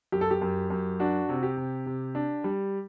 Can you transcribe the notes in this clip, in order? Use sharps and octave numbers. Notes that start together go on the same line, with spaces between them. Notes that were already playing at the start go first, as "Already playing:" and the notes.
F#2 G4
A4
G4
F#2
F#2
D4 F#4
C3
G4
C3
C3
D4
G3